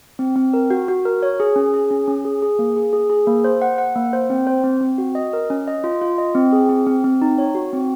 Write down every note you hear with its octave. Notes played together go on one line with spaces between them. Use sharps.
C4
C4
A#4
F#4
F#4
A#4
C#5
G#4
C#4
G#4
C#4
C#4
G#4
G#4
A#3
G#4
G#4
G#4
A#3
C5
F#5
F#5
A#3
C5
C4
C5
C4
C4
F#4
D#5
A#4
C#4
D#5
F4
F4
D#5
C4
G#4
C4
C4
C4
D#4
C#5
F#4
C4